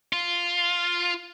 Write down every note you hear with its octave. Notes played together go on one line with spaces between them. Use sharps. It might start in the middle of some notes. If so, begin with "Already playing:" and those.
F4